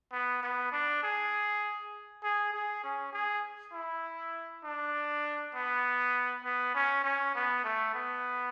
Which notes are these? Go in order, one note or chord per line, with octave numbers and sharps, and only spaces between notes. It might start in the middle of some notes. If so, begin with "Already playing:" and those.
B3
B3
D4
G#4
G#4
G#4
C#4
G#4
E4
D4
B3
B3
C#4
C#4
B3
A3
B3